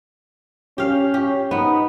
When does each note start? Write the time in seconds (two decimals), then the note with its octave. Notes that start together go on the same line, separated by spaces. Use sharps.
0.78 C#4 G4 F5
1.14 G4
1.51 B3 D#4